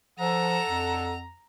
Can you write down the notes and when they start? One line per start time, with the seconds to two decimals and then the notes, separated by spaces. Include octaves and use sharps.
0.19 F3 A4 F#5 A#5 E6
0.67 F2